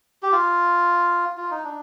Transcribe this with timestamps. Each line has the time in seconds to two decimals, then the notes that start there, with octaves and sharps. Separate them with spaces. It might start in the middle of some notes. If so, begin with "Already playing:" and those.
0.23 G4
0.32 F4
1.37 F4
1.51 D#4
1.64 D4